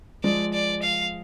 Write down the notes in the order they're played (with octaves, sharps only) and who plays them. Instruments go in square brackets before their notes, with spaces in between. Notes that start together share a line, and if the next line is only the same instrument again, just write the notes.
[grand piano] F3 G#3 [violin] D5
[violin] D5
F5